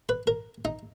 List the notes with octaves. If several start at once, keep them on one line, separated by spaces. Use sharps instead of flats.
B4
A#4
D#4